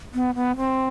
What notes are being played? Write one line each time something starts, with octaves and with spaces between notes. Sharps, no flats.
B3
B3
C4